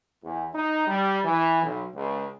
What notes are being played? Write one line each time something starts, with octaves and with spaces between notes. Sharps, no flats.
E2
D#4
G3
E3
B1
C#2